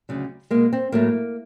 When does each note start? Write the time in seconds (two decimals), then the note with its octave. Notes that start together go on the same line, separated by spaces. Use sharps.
0.09 D2 C#3 F#3
0.50 B2 G#3 A#3
0.73 C4
0.92 A2 F#3 A3 A#3